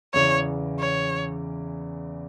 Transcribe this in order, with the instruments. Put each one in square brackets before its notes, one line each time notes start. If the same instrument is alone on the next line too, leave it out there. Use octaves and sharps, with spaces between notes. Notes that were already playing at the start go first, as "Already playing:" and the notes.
[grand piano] E2 C#3 E3 [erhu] C#5
[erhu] C#5